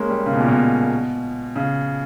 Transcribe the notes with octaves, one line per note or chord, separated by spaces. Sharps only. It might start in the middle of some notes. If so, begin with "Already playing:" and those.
Already playing: G#3 A#3 C#4
G3
C#3
B2
A#2
B2
C#3